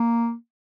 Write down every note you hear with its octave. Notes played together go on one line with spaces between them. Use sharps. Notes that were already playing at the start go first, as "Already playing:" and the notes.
Already playing: A#3